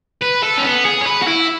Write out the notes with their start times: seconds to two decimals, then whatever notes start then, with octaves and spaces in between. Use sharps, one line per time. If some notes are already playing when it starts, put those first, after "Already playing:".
0.21 B4
0.43 A4
0.58 C#4
0.64 B3
0.84 G#4
1.02 C#5
1.06 B4
1.22 F#4
1.28 E4